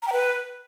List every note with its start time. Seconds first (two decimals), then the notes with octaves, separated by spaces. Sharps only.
0.02 A#5
0.07 G5
0.12 B4